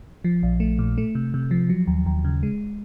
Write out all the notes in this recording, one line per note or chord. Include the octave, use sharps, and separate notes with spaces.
F3
A#1
A3
A#2
A3
C3
C3
F3
F#3
D#2
D#2
C#3
G#3